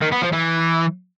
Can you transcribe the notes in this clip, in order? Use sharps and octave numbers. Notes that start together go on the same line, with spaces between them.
D#3
B3
F3
E3